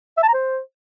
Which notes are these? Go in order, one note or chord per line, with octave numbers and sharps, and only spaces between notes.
E5
A5
A#5
C5